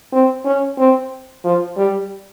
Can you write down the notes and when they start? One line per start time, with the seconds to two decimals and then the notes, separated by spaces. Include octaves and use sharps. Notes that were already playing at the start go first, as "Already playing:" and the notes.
0.12 C4
0.45 C#4
0.78 C4
1.44 F3
1.77 G3